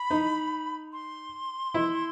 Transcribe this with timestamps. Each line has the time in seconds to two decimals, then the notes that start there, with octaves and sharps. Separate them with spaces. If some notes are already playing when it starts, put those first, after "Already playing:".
Already playing: B5
0.10 D#4
0.93 C6
1.74 E4